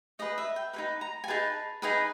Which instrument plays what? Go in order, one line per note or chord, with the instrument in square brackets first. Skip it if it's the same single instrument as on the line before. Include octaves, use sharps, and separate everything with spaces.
[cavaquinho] D#4 G#4 B4 D#5
E5
G5
D#4 G#4 B4 B5
A#5
G#5
D#4 G#4 B4 A5
D#4 G#4 B4 G#5